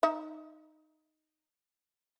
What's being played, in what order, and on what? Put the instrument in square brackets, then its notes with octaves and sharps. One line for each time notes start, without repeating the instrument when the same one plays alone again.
[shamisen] D#4 E5